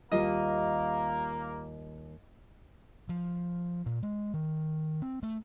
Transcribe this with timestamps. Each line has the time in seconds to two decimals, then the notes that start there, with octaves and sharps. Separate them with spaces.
0.12 D#2 G3 A#3 F4 D#5
3.09 F3
3.86 A#2
4.03 G#3
4.34 D#3
5.02 C4
5.23 A3